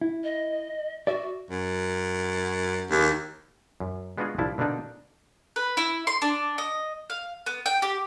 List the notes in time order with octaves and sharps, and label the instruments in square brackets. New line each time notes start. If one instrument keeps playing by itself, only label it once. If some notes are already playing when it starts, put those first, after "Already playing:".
[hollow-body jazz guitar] E4
[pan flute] D#5
[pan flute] F#4 [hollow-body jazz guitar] D5 E5
[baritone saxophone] F#2
D#2
[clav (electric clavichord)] F#2
G#3 B3 D4 F4 F#4 G#4
C2 F3 D4 E4 A5
B2 D3 A#3 D4 D#4
[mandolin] B4
E4
C6
D4
D#5
F5
B3
G5
G4